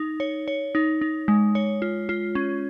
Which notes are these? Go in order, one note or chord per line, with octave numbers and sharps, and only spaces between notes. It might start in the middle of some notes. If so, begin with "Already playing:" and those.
Already playing: D#4
C#5
C#5
D#4
D#4
G#3
C#5
F4
F4
C#4